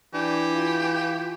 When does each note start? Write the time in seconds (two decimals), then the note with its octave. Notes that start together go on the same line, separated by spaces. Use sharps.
0.14 E3 D4 G4
0.53 F4